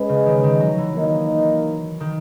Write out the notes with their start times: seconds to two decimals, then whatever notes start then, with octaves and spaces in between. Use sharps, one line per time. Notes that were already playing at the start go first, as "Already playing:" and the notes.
Already playing: G#3 C#4 G#4 B4 D#5
0.09 C#3
0.26 D#3
0.44 D#3
0.60 F#3
0.78 E3
0.96 D#3 A#3 D#4 A#4 D#5
2.00 D#3